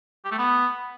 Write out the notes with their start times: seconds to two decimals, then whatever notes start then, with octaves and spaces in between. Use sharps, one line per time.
0.25 G4
0.31 A3
0.38 B3